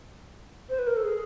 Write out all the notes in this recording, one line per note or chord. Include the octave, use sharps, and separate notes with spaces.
C5
B4
A#4
A4
G#4